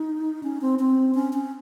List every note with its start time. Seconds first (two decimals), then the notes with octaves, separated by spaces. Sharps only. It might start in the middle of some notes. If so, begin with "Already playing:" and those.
Already playing: D#4
0.43 C#4
0.62 C4
0.79 C4
1.15 C#4
1.33 C#4